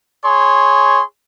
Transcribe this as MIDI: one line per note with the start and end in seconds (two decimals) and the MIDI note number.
0.24 1.02 68
0.24 1.02 73
0.24 1.02 84